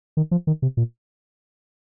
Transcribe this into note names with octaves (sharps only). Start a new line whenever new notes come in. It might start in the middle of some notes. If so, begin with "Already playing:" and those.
D#3
F3
D#3
C3
A#2